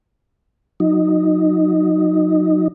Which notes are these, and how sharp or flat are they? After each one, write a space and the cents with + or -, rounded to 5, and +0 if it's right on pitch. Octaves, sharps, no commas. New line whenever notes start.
F#3 -25 D#4 +0